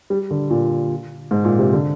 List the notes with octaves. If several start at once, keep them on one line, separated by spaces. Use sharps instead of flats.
G3
D3
A#2
G#2
A#2
C3
D3